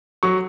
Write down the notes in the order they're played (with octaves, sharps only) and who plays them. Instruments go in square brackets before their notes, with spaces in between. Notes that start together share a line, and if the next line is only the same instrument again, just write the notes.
[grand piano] F#3 C#6